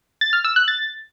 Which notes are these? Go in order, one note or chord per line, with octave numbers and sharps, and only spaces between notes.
A6
F6
E6
F#6
A6